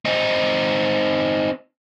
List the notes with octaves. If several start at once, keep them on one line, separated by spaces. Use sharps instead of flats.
C4 D#4